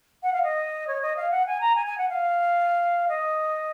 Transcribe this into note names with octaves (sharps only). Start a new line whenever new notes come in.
F#5
F5
D#5
C#5
D#5
F5
F#5
G#5
A#5
G#5
G#5
F#5
F5
D#5